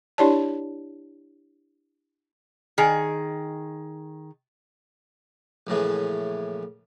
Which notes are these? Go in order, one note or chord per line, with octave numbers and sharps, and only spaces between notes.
D4 E4 G4 C#5 D5 A5
D#3 G#4
A#1 A2 C#3 E3